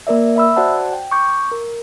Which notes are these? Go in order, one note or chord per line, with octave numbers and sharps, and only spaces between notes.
A#3 A#4 D5 E5
E5 B5 E6
F#4 C5 D5 F#5 A5
G5
C#6 D6 G6
A#4